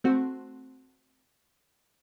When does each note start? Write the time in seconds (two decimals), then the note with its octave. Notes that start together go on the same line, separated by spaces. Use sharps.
0.04 A3 C4 F#4